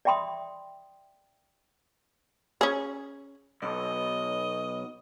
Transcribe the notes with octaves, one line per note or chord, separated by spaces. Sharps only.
D5 E5 G5 B5 C6 D#6
C#4 G#4
B1 D#5